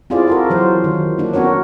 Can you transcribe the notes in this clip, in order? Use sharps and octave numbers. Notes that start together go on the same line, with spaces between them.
C4 E4 F4 G#4 D5
F#4 A4 A#4
E3 F#3 C5
D#3
A#3 D4
B3 C#4 F#4 A#4 C#5